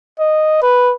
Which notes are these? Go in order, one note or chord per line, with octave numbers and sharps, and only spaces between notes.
D#5
B4